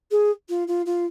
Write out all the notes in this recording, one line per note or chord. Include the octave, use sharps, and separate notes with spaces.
G#4
F4
F4
F4